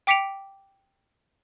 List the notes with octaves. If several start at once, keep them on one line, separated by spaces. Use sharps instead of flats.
G5 D6 B6 C#7 D7 F7